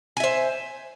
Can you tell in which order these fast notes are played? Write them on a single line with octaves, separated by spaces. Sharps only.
G#5 E5 C5